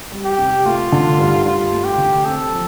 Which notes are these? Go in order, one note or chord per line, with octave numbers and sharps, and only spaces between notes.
G3
G4
C3
A3 F4
D3
G2
G2 F4
A3
G4
D3
C4 A4
F3